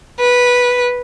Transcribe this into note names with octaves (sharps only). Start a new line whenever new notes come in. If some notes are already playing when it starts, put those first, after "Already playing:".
B4